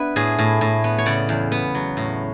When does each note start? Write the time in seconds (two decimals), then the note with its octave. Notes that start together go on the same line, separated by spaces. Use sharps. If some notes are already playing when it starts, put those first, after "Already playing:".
Already playing: B3 D4 E4 B4
0.16 A2 G#4
0.39 A2
0.61 A2
0.84 B3
0.98 C#5
1.06 C#3 D5
1.29 E2
1.52 B3
1.75 F#3
1.97 A2